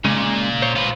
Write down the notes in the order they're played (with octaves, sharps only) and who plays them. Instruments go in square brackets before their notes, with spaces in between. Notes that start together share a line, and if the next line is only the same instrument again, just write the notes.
[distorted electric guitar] A#2 [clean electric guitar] C#3 G#3
[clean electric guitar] C5 C#5
[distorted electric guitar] F4 B4